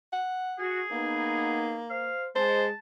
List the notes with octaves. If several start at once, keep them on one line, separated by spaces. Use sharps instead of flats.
F#5
F#4 G#4
A#3 B3 D#4
C5 F5
G#3 C5 A5